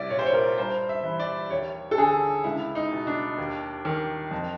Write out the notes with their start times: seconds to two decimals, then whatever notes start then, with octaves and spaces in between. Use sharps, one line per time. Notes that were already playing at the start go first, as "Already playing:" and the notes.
Already playing: C2 D5 E5
0.10 A#2 C#5
0.19 C5
0.26 C#5
0.33 A#4
0.57 G2 C5
0.89 E5
1.03 E3
1.20 D5
1.50 D#2 C#5
1.91 A4
1.98 D3 G#4
2.44 C#2 E4
2.75 D#4
2.91 B2
3.07 D4
3.38 D#2
3.85 D#3
4.31 F2